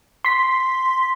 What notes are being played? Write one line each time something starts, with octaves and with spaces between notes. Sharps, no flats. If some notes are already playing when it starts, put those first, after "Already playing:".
C6 B6